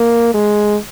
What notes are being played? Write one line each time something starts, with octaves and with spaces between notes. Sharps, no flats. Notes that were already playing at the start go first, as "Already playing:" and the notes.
Already playing: A#3
G#3